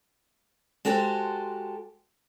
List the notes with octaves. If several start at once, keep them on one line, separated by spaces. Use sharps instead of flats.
G#3 F#4 G4 A4 C5